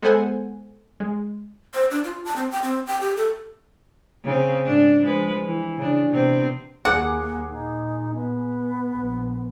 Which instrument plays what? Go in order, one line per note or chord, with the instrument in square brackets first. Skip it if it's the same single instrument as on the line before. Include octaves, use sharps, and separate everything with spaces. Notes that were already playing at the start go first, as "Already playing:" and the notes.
[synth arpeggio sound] G#3 B3 A4 C5 F#5 G#5
G#3
[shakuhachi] C5
D4
F4
A5
C4
G5
C4
G5
G4
A4
[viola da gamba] C#3 C4
G#2 D4
F3 G#3 B4
E3
C#3 D4
C3 B3 C4
[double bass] D#2 A#3 [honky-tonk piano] G#4 D6 [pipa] F#5
[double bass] A#2 [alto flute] D#4
[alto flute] B3
[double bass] A#1